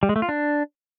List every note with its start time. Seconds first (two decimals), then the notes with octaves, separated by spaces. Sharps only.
0.03 G3
0.09 G#3
0.16 A3
0.22 F4
0.29 D4